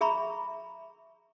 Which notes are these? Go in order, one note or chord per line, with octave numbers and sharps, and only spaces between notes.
G#4 E5 A#5 B5 C#6